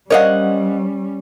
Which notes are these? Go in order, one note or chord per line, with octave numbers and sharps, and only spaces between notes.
G3 C#4 A#4 C5 C#5 D#5 F5 F#5